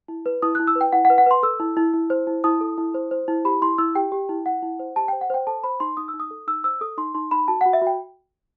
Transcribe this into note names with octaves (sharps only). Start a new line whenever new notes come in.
E4
B4
E4 D#6
E4 F#6
E6
B4
G5
E4 F#5
F#5
B4
F#5
B4 C6
A4 E6
E4
E4
E4
C5
E4
E4 D#6
A4
E4
C5
C5
E4
G4 B5
E4 C6
E4 E6
G4 G5
G4
E4
E4 F#5
E4
C5
G4 A5
C5 G5
F#5
C5 G5
A4 A5
C5 B5
D#4 C6
D#4 D#6
E6
D#4
D#6
A4
D#4 E6
C5 E6
A4 D#6
D#4 C6
D#4 C6
D#4 B5
F#4 A5
F#4 F#5
E5
F#4 G5